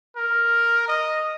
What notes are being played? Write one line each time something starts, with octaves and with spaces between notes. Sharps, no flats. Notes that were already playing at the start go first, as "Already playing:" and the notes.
A#4
D#5